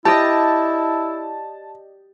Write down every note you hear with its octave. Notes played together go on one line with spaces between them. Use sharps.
E4 G4 D5 D#5 A5